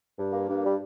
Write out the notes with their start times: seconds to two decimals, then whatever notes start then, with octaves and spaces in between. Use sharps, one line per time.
0.18 G2
0.33 A#3
0.49 G2
0.64 G3